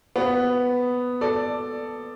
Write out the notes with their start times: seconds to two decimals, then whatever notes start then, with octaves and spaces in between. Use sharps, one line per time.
0.16 B3
1.21 A4 D5